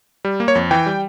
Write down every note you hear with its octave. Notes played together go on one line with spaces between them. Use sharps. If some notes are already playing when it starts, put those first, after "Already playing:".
G3
A#3
C#5
F2
E3 G5
G3